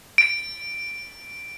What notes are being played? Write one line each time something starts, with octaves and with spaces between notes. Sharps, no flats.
D7